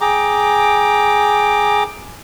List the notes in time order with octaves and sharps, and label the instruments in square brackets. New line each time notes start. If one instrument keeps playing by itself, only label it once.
[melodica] G#4 G5 A#5 D6